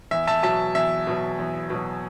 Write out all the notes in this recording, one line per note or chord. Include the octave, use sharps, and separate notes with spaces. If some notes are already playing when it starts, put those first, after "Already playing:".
E2 E5
E5 A5
B2 F#3 E5 A5
E2 E5
B2 F#3
E2
B2 F#3